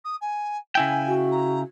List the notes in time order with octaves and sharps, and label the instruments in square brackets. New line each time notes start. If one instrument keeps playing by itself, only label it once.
[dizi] D#6
G#5
[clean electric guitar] C#3 E4 G5 [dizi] G#5
[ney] F#4
[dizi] A#5